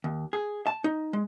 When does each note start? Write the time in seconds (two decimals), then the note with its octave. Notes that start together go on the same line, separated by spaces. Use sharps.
0.04 D#2
0.33 G#4
0.67 A5
0.84 D#4
1.13 G#3